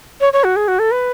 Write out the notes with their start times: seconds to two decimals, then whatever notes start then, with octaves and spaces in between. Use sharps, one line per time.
0.21 C#5
0.33 C#5
0.44 F#4
0.56 G#4
0.68 F#4
0.79 A4
0.91 B4